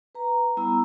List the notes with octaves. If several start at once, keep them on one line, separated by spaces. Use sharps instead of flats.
B4 A#5
G3 B3 E4 A#5 B5 E6